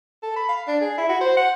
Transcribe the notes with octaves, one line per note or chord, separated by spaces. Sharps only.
A4
B5
F5
D4
G#4
E4
F#4
C5
F#5